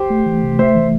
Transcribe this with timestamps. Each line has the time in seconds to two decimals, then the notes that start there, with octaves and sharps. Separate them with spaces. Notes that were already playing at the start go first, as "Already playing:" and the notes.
Already playing: G4 C5
0.10 A3
0.26 E3
0.43 C3
0.59 A3 C5 E5
0.75 E3